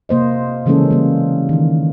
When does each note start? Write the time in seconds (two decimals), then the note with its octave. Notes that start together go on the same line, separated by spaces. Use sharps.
0.09 C3 A#3 C5 D#5
0.66 C#3 E3 G#3 A#3 C#4 A4
0.91 G3 A#3
1.49 D#3 E3